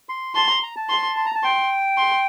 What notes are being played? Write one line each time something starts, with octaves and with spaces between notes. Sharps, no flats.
C6
A5 C6
A#5
A#5
A5
C6
C6
A#5
A5
G5 C6
C6